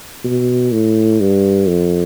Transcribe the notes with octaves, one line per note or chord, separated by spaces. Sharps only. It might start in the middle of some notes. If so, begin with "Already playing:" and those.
B2
A2
G2
F2